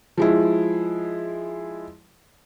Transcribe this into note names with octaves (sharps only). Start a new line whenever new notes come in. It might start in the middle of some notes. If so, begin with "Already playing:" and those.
F3 G#3 E4